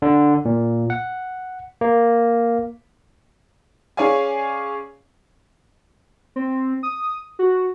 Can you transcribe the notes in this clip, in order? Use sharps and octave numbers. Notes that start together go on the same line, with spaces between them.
D3
A#2
F#5
A#3
C#4 G#4 C#5 D5 F5 G#5
C4
D#6
F#4